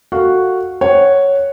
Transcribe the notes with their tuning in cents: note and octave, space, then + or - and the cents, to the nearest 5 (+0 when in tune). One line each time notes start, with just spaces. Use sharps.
F#4 +0 A4 +25 F5 +0
C#5 +0 F#5 +0